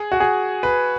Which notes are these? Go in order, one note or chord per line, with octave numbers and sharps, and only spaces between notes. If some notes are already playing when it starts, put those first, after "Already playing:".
Already playing: G#4
F#4
G#4
B4